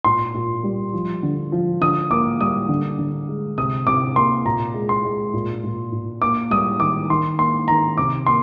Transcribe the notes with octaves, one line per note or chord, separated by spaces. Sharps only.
A#2 C6
A#2
G3
F3
D3
F3
D3 D#6
A#3 D6
G3 D#6
D3
D3
G#3
C3 D#6
C3 D6
A#3 C6
A#2 A#5
G#3
C6
G#3
A#2
A#2
A#2
A#3 D6
G3 D#6
D#3 D6
D#3 C6
A#3 C6
D#3 A#5
C3 D6
A#3 C6